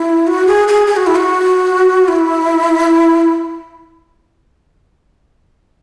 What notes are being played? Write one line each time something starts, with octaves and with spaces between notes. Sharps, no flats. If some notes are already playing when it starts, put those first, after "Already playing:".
Already playing: E4
F#4
G#4
G#4
G#4
F#4
E4
F#4
E4